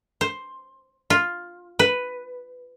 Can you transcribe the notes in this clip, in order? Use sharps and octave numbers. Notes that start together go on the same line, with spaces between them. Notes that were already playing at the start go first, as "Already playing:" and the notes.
C5
F4
B4